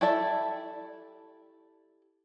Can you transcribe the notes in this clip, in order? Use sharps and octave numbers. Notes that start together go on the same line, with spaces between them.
E4 G4 A4 D5 E5